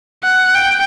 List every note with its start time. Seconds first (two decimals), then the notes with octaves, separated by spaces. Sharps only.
0.24 F#5
0.55 G5